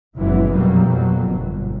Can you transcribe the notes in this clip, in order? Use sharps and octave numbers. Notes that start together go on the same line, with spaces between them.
F#1 A#2 E3 G#3 B3
F2 B2 F#3 G3 A#3
F2 B2 F#3
G1